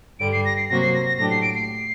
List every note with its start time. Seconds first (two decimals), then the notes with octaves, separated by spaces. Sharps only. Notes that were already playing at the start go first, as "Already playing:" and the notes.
0.20 G2 D3 G3 D7
0.32 C7
0.45 A#6
0.57 C7
0.69 C3 F#3 A#3 F#4 C5 A#6
0.82 C7
0.94 A#6
1.06 A#6
1.17 A2 F#3 A3 D4 G4 A#6
1.30 C7
1.42 D7
1.55 C7